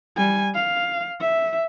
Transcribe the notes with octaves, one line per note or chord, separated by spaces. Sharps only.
G3 G#5
F5
E5